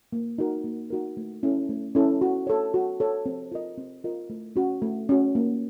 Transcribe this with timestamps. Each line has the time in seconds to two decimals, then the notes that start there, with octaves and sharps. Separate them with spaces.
0.13 A#3
0.38 D#4 F#4 A#4
0.64 A#3
0.90 D#4 F#4 A#4
1.17 A3
1.43 C#4 E4 A4
1.69 A3
1.95 C#4 E4 A4
2.21 F#4
2.47 A4 C#5
2.74 F#4
3.00 A4 C#5
3.26 C4
3.52 F4 A#4 D#5
3.78 C4
4.04 F4 A#4 D#5
4.30 A3
4.56 C#4 F#4
4.82 A3
5.09 C#4 F#4
5.35 A#3